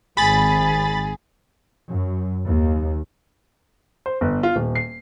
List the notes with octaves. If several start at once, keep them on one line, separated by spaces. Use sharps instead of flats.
G#1 G#4 B5 A6
F#2
D#2
C5
G1
F4
D#1
C7